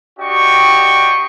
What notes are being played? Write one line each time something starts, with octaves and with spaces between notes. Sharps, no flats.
D4 F#4 G4 D#5 G5 C#6